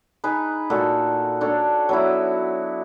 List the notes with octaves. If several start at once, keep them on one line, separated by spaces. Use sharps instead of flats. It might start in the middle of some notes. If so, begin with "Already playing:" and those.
D#4 G#4 B4
A#2 F#4 A4 D#5
D4 A4 C#5
F#3 B3 E4